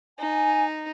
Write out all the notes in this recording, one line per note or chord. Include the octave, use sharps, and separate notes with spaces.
D#4 G#5